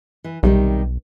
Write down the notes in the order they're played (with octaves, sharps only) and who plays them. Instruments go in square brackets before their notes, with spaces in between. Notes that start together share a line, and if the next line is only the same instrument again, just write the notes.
[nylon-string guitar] E3
[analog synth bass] B1 [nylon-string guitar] C3 D#3 G3